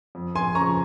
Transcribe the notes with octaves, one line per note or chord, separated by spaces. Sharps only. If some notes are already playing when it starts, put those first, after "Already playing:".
F2
G#5 C6
C#3 F3 A#5 C#6